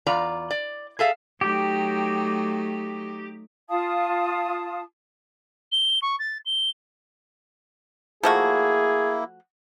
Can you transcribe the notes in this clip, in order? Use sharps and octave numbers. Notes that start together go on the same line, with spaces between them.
E2 F4 D5 A#5
D5
G#4 A4 E5 F5
F#3 A3 D#4 G4
F4 F5 A5 D#6
G7
C#6
A6
G7
F3 A3 A#3 E4 F#4 G#4